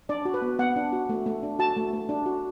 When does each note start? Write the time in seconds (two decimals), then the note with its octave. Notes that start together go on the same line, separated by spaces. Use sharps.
0.09 D4 D5
0.25 F#4
0.34 B4
0.42 B3
0.59 B3 F#5
0.76 D4
0.93 F#4
1.09 A3
1.26 A3
1.43 D4
1.59 F#4 A5
1.77 A3
1.93 A3
2.09 D4
2.26 F#4